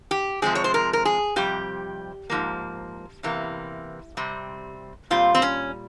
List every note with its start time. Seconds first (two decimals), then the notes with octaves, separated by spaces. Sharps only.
0.11 G4
0.42 C3 F3 G#3 C4 G#4
0.55 C#5
0.64 C5
0.74 A#4
0.93 A#4
1.05 G#4
1.36 F2 C3 G3 G4
2.30 G#2 F3 A#3
3.23 E2 C3 E3 A#3
4.17 C3 G3 C4
5.10 A#2 G3 C4 F4
5.35 C4
5.42 C#4